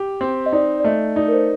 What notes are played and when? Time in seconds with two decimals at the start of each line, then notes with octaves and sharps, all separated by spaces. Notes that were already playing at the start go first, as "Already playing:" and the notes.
Already playing: G4
0.21 C4
0.46 D#5
0.53 D#4 D5
0.80 D5
0.84 A3 D#5
1.16 D#4 D5
1.28 A#4
1.33 C5